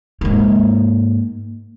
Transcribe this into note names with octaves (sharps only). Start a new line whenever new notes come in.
G#2 A#3